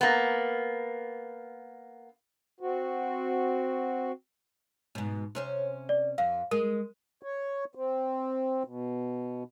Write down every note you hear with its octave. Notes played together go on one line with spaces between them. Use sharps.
A#3 B3
C4 F#4
G#2 B2
C3 C#4 C5
D5
F2 F5
G#3 A#4
C#5
C4
B2